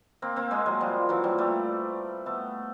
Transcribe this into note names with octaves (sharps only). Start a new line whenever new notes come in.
A#3 C4
A#3 C4
G#3 A#3
F#3 G#3
F3 G3
E3 F#3
F3 G3
G3 A3
A3 B3